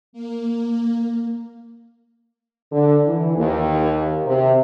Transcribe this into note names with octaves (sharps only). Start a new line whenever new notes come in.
A#3
D3
E3
D#2
C3